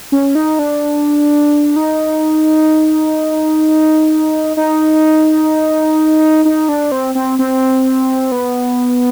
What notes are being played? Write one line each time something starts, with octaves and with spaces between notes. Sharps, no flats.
C#4
D#4
D4
D#4
D#4
D#4
D4
C4
C4
C4
B3